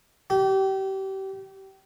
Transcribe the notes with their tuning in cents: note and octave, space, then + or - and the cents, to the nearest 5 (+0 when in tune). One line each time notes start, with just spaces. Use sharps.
G4 -30